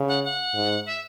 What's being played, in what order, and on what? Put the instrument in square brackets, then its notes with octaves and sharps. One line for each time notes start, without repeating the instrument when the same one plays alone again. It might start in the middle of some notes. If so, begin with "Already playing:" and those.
Already playing: [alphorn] C#3
[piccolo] F#5
F#5
[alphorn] G#2
[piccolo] E5